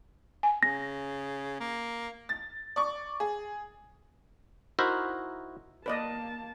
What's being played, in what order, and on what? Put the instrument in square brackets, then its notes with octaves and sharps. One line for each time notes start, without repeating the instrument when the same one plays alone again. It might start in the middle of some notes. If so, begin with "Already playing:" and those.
[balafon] G#5
[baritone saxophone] C#3 [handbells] A#6
[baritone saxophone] A#3
[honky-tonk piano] A6
D5 C#6
G#4
[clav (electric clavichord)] D#4 E4 F#4 A#4 C5 E5
[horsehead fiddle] A#3 A5 [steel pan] B4 D5 D#5